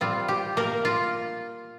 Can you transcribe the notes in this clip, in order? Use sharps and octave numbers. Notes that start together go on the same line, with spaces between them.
A#2 G3 C4 F4
G4
A#3 A#4
F4